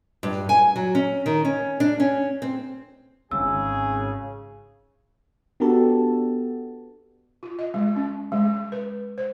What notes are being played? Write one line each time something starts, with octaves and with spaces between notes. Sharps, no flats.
G2
G#5
F#3
C#4
D#3
C#4
D4
C#4
C4
G#1 C#3 G#4 E6
B3 D4 F#4 G4 A4 A5
F4
D#5
G#3
C#4
G#3
B4
C5